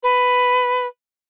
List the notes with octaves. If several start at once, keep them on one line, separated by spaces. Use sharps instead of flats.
B4